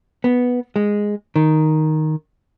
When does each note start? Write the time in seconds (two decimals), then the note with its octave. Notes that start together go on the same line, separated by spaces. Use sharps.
0.24 B3
0.76 G#3
1.36 D#3